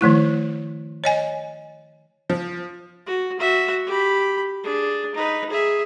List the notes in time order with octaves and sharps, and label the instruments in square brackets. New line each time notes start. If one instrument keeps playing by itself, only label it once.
[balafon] D#3 F3 A3 E4
C#5 D#5 G#5
[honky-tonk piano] F3
[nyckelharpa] F#4
F#4 E5
G4 B5
D4 G#4
D#4 B4
G#4 E5